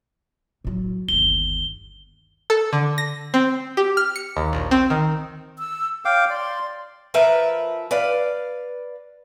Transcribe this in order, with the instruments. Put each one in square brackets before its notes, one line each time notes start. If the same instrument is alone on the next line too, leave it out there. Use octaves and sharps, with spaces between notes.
[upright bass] A2 F#3
[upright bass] G1 D#2 [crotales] G7
[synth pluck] A4
D3
A#6
C4
G4
F6
C#7
D#2
A#1
C4
D#3
[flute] E6
[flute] C#5 [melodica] F5 G5 D6
[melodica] D5 [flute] C6
[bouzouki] F3 A#4 B4 E5
B4 D5 F5